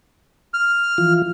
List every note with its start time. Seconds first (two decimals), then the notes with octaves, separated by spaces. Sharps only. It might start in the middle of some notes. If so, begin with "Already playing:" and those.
0.54 F6
0.98 E3 F3 F4